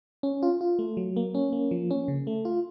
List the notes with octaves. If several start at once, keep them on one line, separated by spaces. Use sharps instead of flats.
C#4
F4
F4
A3
F#3
A#3
C#4
A#3
F3
C#4
C#3
A3
F4